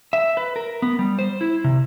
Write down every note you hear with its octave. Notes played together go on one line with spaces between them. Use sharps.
E5
B4
A#4
B3
G3
C5
E4
C3